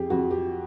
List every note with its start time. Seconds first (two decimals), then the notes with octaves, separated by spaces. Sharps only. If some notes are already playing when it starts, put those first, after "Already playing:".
Already playing: F2 G4 G#4
0.10 F2 F#4
0.31 G4